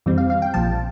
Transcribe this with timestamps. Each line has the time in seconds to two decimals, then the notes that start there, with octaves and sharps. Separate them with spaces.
0.06 F2 E3 G3 C4
0.18 F5
0.30 F5
0.42 G5
0.54 A#1 A#2 F3 A5